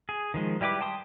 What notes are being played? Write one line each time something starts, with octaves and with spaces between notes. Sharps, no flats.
G#4
D#3 F3 G#3
G3 E4 G4 B4 D6
G5 A5 C6 D#6